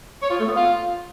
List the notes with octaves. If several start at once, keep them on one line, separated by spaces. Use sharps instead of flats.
C#5
F4
A3
B3
F4